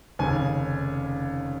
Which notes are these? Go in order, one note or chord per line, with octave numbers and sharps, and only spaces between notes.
F1 D#2 C#3 G#5